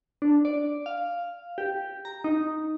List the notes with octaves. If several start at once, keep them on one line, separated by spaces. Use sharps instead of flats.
D4
D5
F5
G4
A#5
D#4